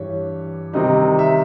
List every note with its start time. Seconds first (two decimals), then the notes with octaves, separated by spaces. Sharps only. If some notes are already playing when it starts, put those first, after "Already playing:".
Already playing: G2 E3 G3 C#5
0.73 C3 D#3 G3 C4 D#4 D#5
1.19 E5